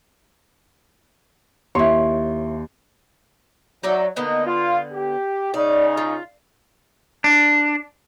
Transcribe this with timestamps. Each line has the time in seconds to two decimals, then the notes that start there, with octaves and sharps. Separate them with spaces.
1.75 D#2 E4 C#5 C6
3.83 F#3 D#4 D5 E5
4.16 D3 A#3 B3 D#4 D#5 G5
4.46 F4
4.93 G4
5.54 C#3 D#4 D5
5.97 F4
7.24 D4